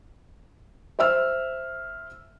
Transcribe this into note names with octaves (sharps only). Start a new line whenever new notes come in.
C5 E5 E6 F6